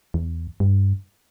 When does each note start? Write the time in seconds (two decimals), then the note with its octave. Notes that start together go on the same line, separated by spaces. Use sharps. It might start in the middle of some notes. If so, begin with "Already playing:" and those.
0.14 E2
0.60 G2